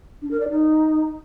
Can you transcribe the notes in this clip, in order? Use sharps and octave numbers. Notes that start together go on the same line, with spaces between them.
D4
A#4
D5
D#4